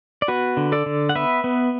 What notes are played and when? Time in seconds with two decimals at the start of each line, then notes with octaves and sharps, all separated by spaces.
0.22 D5
0.28 B3 F#4 B4
0.57 D3
0.72 A4 D5
0.86 D3
1.09 F#5
1.15 B3 B4 E5
1.44 B3